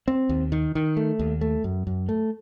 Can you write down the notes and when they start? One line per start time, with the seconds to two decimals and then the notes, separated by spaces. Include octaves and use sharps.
0.08 C4
0.29 D#2
0.52 D#3
0.75 D#3
0.97 A3
1.19 D#2
1.41 A3
1.64 F#2
1.87 F#2
2.09 A3